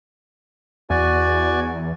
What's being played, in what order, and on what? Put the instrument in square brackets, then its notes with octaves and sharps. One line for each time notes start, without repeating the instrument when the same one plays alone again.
[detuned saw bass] E2 [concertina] F#4 D5 G#5